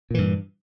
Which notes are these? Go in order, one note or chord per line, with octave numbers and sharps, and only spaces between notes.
G2 A#2 E3